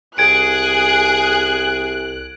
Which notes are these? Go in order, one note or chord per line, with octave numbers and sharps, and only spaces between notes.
C2 G#4 F#6 G#6 D7